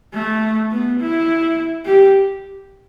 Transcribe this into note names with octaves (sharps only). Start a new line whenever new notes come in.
A3
B3
E4
G4